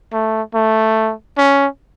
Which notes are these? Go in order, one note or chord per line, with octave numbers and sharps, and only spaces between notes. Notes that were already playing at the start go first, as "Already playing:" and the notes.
A3
A3
C#4